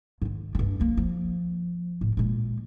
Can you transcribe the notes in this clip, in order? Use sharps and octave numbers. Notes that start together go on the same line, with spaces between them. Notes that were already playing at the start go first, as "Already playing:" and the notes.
G#2 D#3
G2 D4
F3 A#3
F3
A2
A#2 G#3